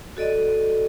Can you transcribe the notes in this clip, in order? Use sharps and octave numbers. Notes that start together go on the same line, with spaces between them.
F#4 A4 D5 D#5